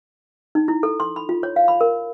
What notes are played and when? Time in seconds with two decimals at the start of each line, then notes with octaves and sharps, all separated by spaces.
0.55 D#4
0.68 E4
0.83 A4
1.00 C6
1.16 B5
1.29 F4
1.43 C#5
1.56 F5
1.68 B5
1.81 A#4